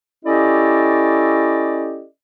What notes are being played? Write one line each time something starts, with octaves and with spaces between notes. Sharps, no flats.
C#4 E4 G4 A4 D5 D#5